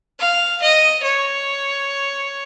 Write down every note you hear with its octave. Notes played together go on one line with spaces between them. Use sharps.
F5
D#5
C#5